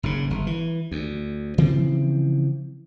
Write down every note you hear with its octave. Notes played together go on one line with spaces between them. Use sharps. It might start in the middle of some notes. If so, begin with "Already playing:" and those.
F#1 G#2 C#3
G1
E3
D2
C#3 E3 F3 C4